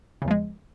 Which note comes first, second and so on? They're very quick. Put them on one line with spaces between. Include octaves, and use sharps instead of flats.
C#3 E2 F3 G#3